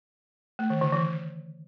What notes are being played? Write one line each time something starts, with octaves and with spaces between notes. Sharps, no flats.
A3
D#3
D3
E3